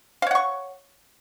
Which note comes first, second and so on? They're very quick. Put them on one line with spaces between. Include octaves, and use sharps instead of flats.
F5 C#5 F#5 C#6